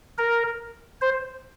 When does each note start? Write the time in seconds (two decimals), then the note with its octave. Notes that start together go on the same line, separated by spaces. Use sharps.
0.18 A#4
1.01 C5